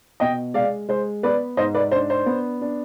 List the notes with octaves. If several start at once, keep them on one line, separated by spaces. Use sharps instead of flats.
B2 D#5 G5
G#3 D5 F5
G#3 C5
B3 B4 D5
G#2 C5 D#5
B4 D5
D4 C5
C5
B3
D4